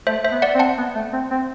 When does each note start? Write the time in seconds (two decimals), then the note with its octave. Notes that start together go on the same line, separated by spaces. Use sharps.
0.07 A3 C5 E5
0.24 C5 E5
0.31 B3
0.42 D5 F#5
0.55 C4
0.59 F#5 A5
0.78 B3
0.95 A3
1.13 C4
1.31 C4